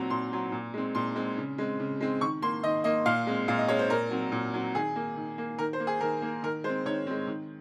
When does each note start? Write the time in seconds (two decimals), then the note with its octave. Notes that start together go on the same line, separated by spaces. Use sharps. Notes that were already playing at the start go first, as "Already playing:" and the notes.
Already playing: A#2 F#3 C4 A#5
0.10 A#2 C6
0.32 F#3 C4
0.52 A#2
0.74 G#3 C4
0.95 A#2 C6
1.15 G#3 C4
1.38 C#3
1.58 G#3 C4
1.80 C#3
2.00 G#3 C4
2.21 D#3 C#6
2.42 A#3 C6
2.63 D#3 D#5
2.84 A#3 D#5
3.06 A#2 F5
3.27 G#3 C4
3.48 A#2 F5
3.58 D#5
3.68 G#3 C4 C#5
3.79 C5
3.90 A#2 A#4
4.11 F#3 C4
4.32 A#2
4.54 F#3 C4
4.75 D#3 G#4
4.96 A#3
5.16 D#3
5.38 A#3
5.58 D#3 A#4
5.73 C5
5.80 A#3
5.87 G#4
6.01 D#3 A#4
6.22 A#3
6.43 D#3 A#4
6.64 G#3 C5
6.69 C4
6.86 D#3 C#5
7.07 G#3 C4
7.27 D#3